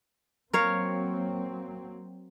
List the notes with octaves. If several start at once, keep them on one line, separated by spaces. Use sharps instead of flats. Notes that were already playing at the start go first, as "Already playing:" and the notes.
F#3 A#3 C4 A#4 C#5 F5